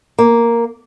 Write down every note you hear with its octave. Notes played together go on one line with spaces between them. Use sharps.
A#3